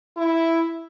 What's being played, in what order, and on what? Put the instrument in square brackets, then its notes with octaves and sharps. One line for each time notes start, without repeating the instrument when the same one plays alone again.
[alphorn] E4